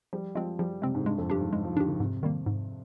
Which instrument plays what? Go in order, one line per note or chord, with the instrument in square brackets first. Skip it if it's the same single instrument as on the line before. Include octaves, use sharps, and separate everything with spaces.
[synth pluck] F3 [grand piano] G3
[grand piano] F3 [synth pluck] G#3 C4
[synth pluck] F3 [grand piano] G3
[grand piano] C3 [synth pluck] G#3 C4
[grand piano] G#2
[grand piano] G2 [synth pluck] G#3
[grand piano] F2
[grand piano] G2 [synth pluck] D4 G4
[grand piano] G#2
[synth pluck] G#3
[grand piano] F3
[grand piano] D#3 [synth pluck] D4 G4
[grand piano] D#3
[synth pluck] G#2 [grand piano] C3
[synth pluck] D#3 G3 A#3
G#2